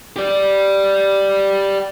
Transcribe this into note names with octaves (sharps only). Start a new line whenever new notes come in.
G4 D5